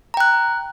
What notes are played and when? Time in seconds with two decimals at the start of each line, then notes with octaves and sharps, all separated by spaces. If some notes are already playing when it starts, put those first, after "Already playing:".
0.14 A#5
0.17 G5
0.20 F#6